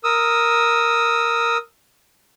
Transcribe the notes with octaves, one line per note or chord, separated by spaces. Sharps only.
A#4 D#6 E6